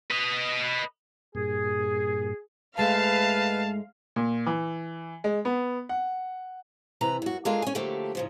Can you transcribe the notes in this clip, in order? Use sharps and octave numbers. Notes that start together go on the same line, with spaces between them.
B4 D#5
G2 A#2 G#4
G#2 G#3 A3 B4 F5 A5
A#2
E3
G#3
B3
F#5
C3 E3 B4 A#5
F#2 F#4
G#3 A#3 D4 F4 G#4 A4
C#4 G#5
D3 F3 F#3 A3 A#3 G4
G#2 C#3 F3